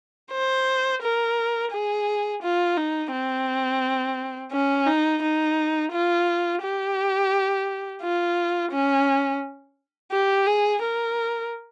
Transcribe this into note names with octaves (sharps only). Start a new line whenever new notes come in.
C5
A#4
G#4
F4
D#4
C4
C#4
D#4
D#4
F4
G4
F4
C#4
G4
G#4
A#4